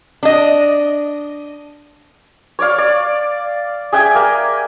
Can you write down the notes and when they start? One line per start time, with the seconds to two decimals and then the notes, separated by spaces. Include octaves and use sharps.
0.23 D4 D#5
2.59 C#5 D5 F5
2.78 D5
3.93 G#4 E5 G5 G#5
4.15 A#3